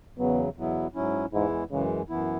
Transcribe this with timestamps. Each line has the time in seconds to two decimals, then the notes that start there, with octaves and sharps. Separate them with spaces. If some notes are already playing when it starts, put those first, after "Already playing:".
0.18 E2 C#3 F#3 B3
0.57 E2 B2 F#3 B3 E4
0.95 G#2 F#3 C#4 E4
1.33 E2 G#2 E3 G#3 E4
1.71 F#2 C#3 E3 G#3
2.10 F#2 E3 B3 E4